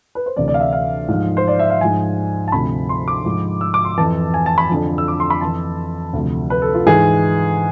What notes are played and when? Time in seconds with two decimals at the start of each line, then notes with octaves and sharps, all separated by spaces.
0.15 B4
0.26 C5
0.36 D2 C3 E3 D5
0.48 D5
0.54 F5
0.60 E5
0.73 F5
1.09 G#2 F3
1.37 C5
1.48 D5
1.59 E5
1.70 F5
1.81 G#2 F3 G#5
2.48 A5
2.52 D2 C3 F3 B5
2.89 C6
3.08 D6
3.25 G#2 F3
3.61 E6
3.74 D6
3.85 C6
3.98 F2 E3 A5
4.34 G#5
4.46 A5
4.58 B5
4.69 F2 D3 F3
4.98 E6
5.08 D6
5.20 C6
5.30 B5
5.41 F2 E3 A5
6.13 D2 C3 F3
6.50 B4
6.62 A4
6.74 F4
6.86 G#2 E3 G#4